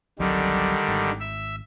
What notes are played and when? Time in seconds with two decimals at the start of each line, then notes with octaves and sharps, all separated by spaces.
0.19 G1 C2 D3 D#3 F#3 G3
0.88 G#1
1.20 E5